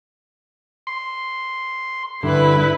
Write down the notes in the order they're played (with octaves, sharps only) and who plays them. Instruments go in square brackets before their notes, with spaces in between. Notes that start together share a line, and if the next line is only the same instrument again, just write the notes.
[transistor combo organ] C6
[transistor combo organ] G2 D3 [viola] E4 B4